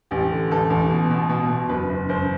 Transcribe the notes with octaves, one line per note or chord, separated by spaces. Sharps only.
A1 G4
D3
A1 A4
A1
B2
B2
B2
B2
F#1 B4
F#1
F#1 C5